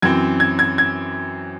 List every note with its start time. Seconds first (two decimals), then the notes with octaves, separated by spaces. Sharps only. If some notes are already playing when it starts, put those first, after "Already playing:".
0.02 F#2 E3 C4 G#6
0.40 G#6
0.59 G#6
0.78 G#6